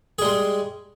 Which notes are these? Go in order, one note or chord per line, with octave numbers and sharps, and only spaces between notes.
G3 G#3 G#4